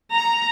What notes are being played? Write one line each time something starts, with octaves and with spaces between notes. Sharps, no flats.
A#5